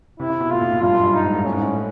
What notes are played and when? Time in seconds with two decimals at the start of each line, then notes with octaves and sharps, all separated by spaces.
0.20 C3 E4
0.30 C3
0.40 B2
0.51 A2 F4
0.61 A#2
0.72 A#2
0.82 G2 F4
0.93 F#2
1.03 G2
1.14 D#4
1.24 G#2
1.34 A2
1.45 A2 C#4
1.53 G#2
1.61 A2